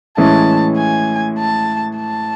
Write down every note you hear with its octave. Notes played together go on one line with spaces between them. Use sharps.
A2 E3 G#3 C#4 E4 A5
G#5
A5
A5